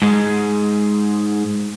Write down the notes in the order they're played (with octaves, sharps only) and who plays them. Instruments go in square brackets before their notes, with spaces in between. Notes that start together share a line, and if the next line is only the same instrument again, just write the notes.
[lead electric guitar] G#2 G#3